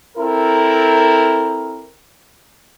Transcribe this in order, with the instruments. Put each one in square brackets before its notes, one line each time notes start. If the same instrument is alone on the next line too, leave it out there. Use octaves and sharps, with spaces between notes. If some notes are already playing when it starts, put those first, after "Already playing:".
[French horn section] C4 E4 A4 A#4